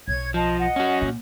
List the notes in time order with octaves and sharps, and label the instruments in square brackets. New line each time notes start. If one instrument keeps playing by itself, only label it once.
[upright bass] B1 [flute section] C#5 G#6
[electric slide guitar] F3 [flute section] D#5 A5
[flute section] D#5 F#5
[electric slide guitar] C#4 F#4
[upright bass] A#2